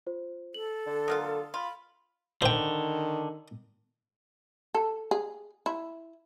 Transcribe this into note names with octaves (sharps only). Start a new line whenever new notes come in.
F4 C5
A4 F#7
D3
F#3 A#3 F4 D#6 F6
F4 B5
D3 D#3 C5 G5
A4
G#4
E4